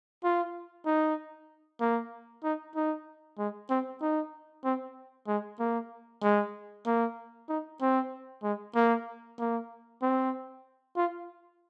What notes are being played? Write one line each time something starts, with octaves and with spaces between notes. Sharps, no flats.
F4
D#4
A#3
D#4
D#4
G#3
C4
D#4
C4
G#3
A#3
G#3
A#3
D#4
C4
G#3
A#3
A#3
C4
F4